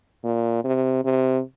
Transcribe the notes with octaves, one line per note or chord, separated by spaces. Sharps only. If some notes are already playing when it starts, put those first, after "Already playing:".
A#2
C3
C3